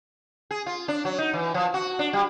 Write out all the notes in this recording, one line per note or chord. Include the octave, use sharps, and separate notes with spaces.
G#4
F4
D4
F#3
D#4
E3
F3
F#4
D4
G3